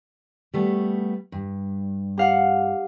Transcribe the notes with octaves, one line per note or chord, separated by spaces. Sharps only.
G3 A3 B3
G2
G4 F5 F#5